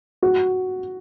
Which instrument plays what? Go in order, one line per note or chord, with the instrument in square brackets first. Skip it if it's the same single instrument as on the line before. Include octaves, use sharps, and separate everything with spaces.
[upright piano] F#4